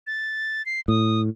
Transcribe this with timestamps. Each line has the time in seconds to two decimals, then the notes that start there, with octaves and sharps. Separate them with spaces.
0.07 A6
0.66 C7
0.88 A2 D#6